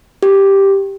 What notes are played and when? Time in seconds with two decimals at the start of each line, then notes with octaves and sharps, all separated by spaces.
0.23 G4